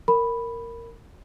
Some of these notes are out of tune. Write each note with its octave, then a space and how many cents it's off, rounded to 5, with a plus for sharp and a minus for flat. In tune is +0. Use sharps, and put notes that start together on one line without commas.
A#4 -10 B5 +0